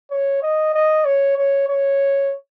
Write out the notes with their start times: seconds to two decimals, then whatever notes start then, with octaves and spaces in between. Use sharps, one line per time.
0.11 C#5
0.43 D#5
0.74 D#5
1.05 C#5
1.37 C#5
1.68 C#5